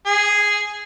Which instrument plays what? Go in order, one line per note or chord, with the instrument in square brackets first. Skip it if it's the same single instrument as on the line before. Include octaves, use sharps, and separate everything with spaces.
[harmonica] G#4